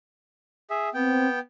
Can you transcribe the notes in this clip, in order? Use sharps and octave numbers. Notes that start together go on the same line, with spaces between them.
G#4 E5
B3 C4 G5